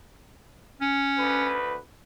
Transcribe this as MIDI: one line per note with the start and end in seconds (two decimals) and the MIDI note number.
0.81 1.58 61
1.18 1.78 38
1.18 1.78 71